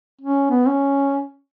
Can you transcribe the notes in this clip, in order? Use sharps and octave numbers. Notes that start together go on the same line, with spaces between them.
C#4
B3
C#4